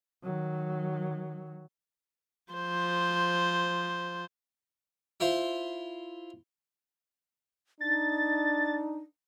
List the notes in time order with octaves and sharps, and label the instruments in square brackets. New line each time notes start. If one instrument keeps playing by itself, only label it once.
[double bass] D#3 F#3
[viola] F3 C5
[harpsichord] E4 F4 C5
[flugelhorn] D4 [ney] D#4 [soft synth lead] A6